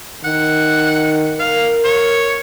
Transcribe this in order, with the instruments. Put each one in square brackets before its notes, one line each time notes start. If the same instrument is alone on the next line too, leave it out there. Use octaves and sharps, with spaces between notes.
[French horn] D#3 [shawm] F#5
[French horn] A#4 [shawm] F5
[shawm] C#5